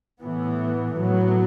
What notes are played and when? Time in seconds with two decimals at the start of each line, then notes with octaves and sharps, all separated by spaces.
0.20 A2 E3 B3
0.95 A2 F#3 B3